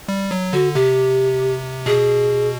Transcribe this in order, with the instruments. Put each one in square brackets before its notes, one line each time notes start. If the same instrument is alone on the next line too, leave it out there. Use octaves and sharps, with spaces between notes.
[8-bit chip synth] G3
F#3
[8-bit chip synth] D3 [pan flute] F#4
[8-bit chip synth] C3 [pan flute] G4
[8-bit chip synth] B2 [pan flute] G#4